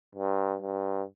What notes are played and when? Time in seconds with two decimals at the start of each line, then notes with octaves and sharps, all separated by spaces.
0.15 G2
0.61 G2